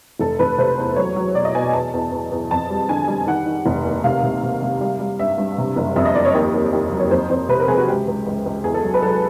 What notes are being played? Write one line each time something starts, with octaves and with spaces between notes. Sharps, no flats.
F1 A4
F1 B4
C3 C5
E2
F#3 C#5
F#3
B2 D5
D#5
B2 G#5
E2 A5
E2
E2
E2
F2 A5
G3
D3 G#5
G3
D#3 F#5
D#3
F1
D#2
C3 F5
C3
C3
C3
G3
G3
G2 E5
G2
C3
F#1
F2 E5
D#5
F#1 D5
C#5
D#2 G4
D#2
D#2 G4
F#3
C#5
F2 C5
F2 C5
C3 B4
A#4
C3 G#4
F#4
C#2 G4
C#2
C#2
C#2
E2 G#4
A4
F#3
B4
F#3 A4